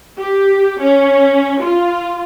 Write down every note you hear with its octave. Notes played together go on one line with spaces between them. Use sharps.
G4
C#4
F4